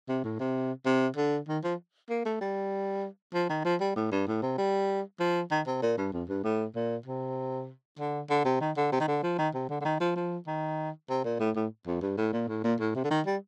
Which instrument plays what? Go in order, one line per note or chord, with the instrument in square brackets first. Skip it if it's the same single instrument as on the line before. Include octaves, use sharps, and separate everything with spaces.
[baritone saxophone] C3
A2
C3
C3
D3
D#3
F3
A#3
A3
G3
F3
D#3
F3
G3
A2
G2
A2
C3
G3
F3
D#3
C3
A#2
G2
F2
G2
A2
A#2
C3
D3
D3
C3
D#3
D3
C3
D#3
D3
F3
D#3
C3
D3
D3
D#3
F3
F3
D#3
C3
A#2
A2
A2
F2
G2
A2
A#2
A2
A#2
A2
C3
D3
D#3
G3